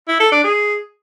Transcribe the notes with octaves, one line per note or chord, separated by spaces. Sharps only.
E4
A4
D4
G#4